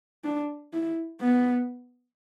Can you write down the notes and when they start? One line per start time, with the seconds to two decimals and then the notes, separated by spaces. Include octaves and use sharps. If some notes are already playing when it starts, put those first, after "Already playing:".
0.24 D4
0.73 E4
1.21 B3